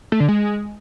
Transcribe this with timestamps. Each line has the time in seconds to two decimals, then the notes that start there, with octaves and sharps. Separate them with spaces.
0.12 A3
0.20 D3
0.28 G#3